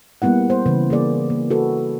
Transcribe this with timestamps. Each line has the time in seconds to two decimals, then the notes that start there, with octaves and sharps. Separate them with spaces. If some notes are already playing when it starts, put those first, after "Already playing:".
0.22 G3 A#3 B3 E4 F#5
0.50 C5
0.66 C#3 E3 B4
0.90 A#3 G#4 D5
1.30 A#3
1.50 F#4 A4 B4